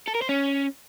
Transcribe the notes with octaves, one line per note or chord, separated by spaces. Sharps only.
A4
A#4
C5
C#4